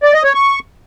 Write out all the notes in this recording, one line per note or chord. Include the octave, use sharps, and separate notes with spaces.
D5
D#5
C#5
C#6